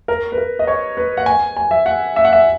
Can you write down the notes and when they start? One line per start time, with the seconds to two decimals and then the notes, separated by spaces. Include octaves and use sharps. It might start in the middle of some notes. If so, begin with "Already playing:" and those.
0.08 A#4
0.32 B4
0.38 A#4
0.59 D#5
0.67 C#5
0.97 B4
1.17 F#5
1.26 G#5
1.57 G#5
1.71 E5
1.86 F#5
2.16 E5
2.25 F#5
2.33 E5